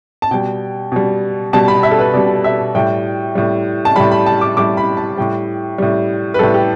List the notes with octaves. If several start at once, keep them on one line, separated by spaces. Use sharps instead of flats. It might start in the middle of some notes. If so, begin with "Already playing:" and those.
A5
B2 G3 G5
B2 G3
B2 G3 A5
B5
E5
A4
B4
B2 G3 D5
E5
A2 G3 G5
A2 G3
A5
A2 G3 B5
B5
A5
D6
A2 G3 D6
B5
A5
A2 G3 G5
A2 G3
B4
A2 G3 A4
G4